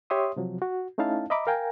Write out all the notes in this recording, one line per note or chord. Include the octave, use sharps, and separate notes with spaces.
G4 C#5 E5 C6 D#6
C3 F3 F#3
F#4
A3 C#4 D#4 E4 F5 A5
D#5 E5 A#5 B5 D6
A#4 F5 G5 G#5 A#5